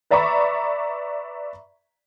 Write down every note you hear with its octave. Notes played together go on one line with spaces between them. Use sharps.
B4 D5 E5 A#5 B5 C#6